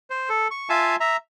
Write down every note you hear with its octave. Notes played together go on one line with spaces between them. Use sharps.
C5
A4
C#6
F4 E5 F5 G#5 A5
E5 A#5